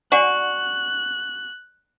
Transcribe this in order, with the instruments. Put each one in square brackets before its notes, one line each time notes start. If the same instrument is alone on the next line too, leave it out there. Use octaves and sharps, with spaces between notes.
[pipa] F#4 [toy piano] D5 F#5 G#5 [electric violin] F#6